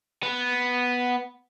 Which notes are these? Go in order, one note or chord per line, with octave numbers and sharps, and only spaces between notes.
B3